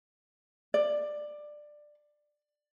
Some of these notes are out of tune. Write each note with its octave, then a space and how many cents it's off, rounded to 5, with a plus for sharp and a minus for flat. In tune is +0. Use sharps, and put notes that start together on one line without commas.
D5 +15